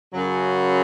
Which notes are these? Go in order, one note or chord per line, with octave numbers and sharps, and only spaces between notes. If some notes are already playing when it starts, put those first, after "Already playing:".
F#2 C#3 F#3